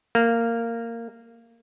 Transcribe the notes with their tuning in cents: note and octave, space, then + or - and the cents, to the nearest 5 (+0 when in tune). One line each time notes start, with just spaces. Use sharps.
A#3 -15